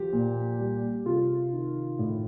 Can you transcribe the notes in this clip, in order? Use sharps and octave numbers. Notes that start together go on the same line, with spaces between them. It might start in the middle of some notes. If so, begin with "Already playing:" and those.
Already playing: F3 G4
A#2
G3
C3 F4
D#3
A2